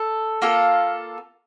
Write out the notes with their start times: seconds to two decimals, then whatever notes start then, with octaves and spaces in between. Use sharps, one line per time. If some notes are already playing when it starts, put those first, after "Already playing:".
Already playing: A4
0.42 A#3 F4 A4